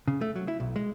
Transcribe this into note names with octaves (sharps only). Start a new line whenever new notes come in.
C#3
A3
F#3
E4
B1
G#3